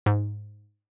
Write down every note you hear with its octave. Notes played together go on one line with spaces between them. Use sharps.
G#2